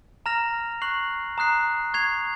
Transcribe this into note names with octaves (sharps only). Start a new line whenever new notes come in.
A#5 F6 A#6 F7
C#6 F#6 C7 F#7
A#5 D#6 F#6 C7
C#6 G#6 C7 F7